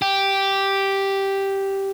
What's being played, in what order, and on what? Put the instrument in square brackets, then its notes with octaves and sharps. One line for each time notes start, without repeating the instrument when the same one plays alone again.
[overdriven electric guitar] G4